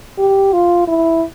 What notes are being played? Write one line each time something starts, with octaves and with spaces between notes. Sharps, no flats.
G4
F4
E4